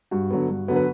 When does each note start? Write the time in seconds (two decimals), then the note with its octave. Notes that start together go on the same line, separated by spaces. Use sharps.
0.11 G2 F#4
0.30 D3 F#3 B3
0.49 G2
0.68 D3 F#3 B3
0.76 B4